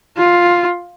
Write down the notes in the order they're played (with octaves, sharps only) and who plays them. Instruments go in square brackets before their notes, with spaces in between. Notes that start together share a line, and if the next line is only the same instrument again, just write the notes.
[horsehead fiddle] F4